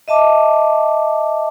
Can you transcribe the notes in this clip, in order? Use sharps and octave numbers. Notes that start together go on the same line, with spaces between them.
D#5 E5 A5 D6